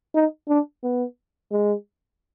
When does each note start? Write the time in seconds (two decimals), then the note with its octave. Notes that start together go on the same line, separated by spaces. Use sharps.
0.15 D#4
0.49 D4
0.83 B3
1.52 G#3